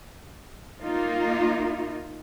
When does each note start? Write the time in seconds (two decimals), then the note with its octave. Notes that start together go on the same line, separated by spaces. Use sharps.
0.81 A#3 D#4 F4